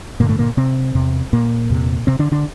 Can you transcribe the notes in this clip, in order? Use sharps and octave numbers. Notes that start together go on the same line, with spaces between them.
G2 A#2 D3 A#3
A2 A3
A#2 A#3
C3 C4
E2 C3
A#2 A#3
E2 C3
C3 C4
D3 D4
D3 D4